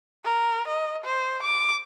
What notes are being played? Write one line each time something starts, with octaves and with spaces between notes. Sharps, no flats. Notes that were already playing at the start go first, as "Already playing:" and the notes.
A#4
D#5
C5
D6